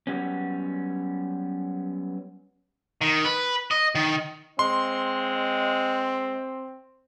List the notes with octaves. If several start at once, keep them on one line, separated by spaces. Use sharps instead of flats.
F#3 G3 B3 C#4
D#3
B4
D#5
D#3
G#3 C4 C6